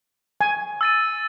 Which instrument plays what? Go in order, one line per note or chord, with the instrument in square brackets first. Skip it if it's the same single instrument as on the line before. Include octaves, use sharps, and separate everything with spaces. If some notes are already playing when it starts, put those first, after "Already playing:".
[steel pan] G#5
[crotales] E6 A6 D#7